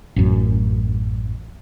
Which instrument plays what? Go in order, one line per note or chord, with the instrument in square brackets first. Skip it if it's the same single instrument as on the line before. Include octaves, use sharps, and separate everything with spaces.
[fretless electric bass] A1 F#2